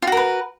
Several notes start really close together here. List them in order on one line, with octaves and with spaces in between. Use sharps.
F4 F#4 A#4 B4